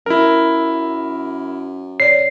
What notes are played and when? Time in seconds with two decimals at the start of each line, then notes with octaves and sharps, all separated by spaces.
0.06 F#2 E4 A#4
2.00 C#5 D5 C7